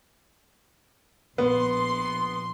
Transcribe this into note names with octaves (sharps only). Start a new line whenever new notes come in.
A#1 B3 C6